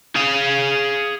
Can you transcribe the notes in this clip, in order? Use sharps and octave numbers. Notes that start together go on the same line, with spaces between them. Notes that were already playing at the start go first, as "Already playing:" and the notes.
G#4 F5